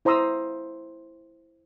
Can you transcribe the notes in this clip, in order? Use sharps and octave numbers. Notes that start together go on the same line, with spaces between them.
E4 C5 A#5 C6 D#6 E6